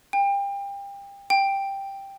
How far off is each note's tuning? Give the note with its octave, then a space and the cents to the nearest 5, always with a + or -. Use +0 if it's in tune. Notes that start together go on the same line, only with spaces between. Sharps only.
G5 +30
G5 +5